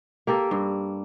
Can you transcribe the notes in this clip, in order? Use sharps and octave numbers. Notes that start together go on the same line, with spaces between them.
A#3 G4 A4 A#4
G2